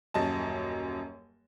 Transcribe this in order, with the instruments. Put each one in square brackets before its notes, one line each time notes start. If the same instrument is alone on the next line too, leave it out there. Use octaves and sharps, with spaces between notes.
[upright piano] D#1 F#2 D#5 A5